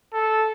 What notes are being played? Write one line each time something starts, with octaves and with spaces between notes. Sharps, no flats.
A4